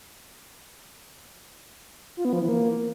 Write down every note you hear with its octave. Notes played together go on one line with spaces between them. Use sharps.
F4
B3
F3
E3
A#3